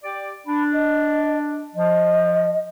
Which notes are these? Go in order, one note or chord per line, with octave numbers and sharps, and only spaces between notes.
G4 D5
D4 B5
D#5
F3 D#5